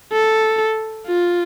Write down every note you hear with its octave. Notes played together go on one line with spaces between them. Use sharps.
A4
F4